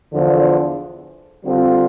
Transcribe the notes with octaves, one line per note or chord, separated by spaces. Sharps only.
E2 D3 F3
D3 G3 C4 F4